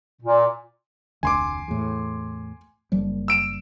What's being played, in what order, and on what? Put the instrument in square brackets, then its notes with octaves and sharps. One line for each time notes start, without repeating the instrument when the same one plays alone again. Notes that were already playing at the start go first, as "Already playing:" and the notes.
[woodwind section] A#2
[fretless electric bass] F1 D2 [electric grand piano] G#5 C6 D6
[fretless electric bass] E2 A2
F#1 F3 G3
[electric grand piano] E6 D7 E7